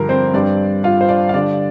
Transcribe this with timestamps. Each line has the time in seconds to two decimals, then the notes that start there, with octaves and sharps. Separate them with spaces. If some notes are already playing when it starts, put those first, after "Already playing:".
Already playing: G2 D3 F3 D4 G4 A#4
0.09 C4 C5
0.34 G2 G3 C4 D4 D5
0.84 F4 F5
1.01 C5
1.09 D4 D5
1.29 F5
1.34 D3 G3 D4 D5